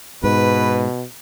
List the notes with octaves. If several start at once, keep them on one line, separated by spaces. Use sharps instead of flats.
G#2 B2 B4